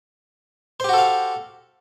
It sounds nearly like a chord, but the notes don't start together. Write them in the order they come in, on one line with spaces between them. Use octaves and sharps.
C5 G4 F#4 A4 F5